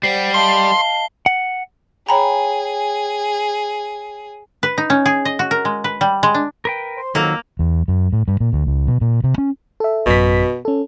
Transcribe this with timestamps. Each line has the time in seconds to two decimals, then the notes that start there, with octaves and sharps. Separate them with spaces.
0.03 G3 C5 F#5 C7
0.34 D#5 F5 A5 C6 G7
1.26 F#5
2.09 G#4 C#5 G5 G#5 A#5 B5
4.63 B4
4.78 D#4
4.90 C#4
5.06 G#4
5.25 D#5
5.39 F#4
5.51 A#4
5.65 G#3
5.84 B4
6.01 G3
6.23 G#3
6.34 D4
6.65 A#4 B4 G5
6.96 C5 C6
7.15 F2 D#3 F#3 A#3 E6
7.59 E2
7.88 F#2
8.13 A2
8.28 G2
8.40 A#2
8.53 D2
8.67 C#2
8.88 B2
9.01 A#2
9.24 C3
9.38 C#4
9.80 A4 E5
10.06 A1 F#2 B2 B6
10.65 C#4 A4